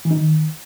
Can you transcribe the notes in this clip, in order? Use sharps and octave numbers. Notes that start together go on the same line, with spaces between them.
E3
D#4
D#3